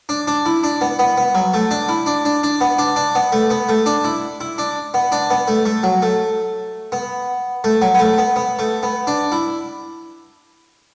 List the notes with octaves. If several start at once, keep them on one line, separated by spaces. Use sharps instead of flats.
D4
D4
E4
D4
B3
B3
B3
F#3
A3
D4
E4
D4
D4
D4
B3
D4
D4
B3
A3
B3
A3
D4
E4
E4
D4
B3
D4
B3
A3
A3
F#3
A3
B3
A3
F#3
B3
A3
B3
B3
A3
B3
D4
E4